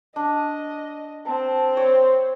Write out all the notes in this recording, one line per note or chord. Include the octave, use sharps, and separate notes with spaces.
D4 D#5
C4 A5
C5 C#5